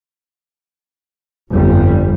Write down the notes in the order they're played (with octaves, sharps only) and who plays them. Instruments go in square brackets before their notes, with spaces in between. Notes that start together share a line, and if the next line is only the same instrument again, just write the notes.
[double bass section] G1 F2 G3